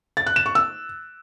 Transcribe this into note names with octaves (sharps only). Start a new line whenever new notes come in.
A6
F#6
E7
C#6
E6